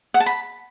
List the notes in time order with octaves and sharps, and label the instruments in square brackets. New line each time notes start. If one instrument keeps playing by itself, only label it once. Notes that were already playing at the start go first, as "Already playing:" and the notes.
[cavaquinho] F#5
A5
B5